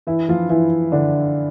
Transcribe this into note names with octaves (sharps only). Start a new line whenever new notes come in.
E3 E4
F3 F4
E3 E4
D3 D4